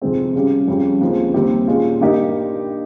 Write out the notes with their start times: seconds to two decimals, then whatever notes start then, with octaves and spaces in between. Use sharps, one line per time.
0.02 F2 C3 D#3 G#3 C4
0.35 C#3 G3 C#4 G4
0.68 F2 C#3 G3 C#4
1.01 D#2 C#3 F3 G#3 C4
1.34 D#2 D#3 G3 C4 G4
1.67 A#2 G#3 C#4 F4
2.00 G2 D#3 A#3 D#4 G4